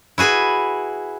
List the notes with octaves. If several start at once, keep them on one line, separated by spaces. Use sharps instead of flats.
E4 F#4 G#4 B4 G#5